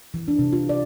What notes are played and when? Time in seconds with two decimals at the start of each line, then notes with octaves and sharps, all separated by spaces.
0.14 E3
0.28 D4
0.39 C3
0.53 F4
0.69 D5